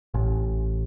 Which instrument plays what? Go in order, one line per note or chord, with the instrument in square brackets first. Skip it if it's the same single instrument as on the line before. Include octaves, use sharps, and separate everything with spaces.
[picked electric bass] A1